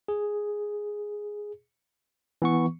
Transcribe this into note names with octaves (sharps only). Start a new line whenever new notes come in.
G#4
E3 B3 C#6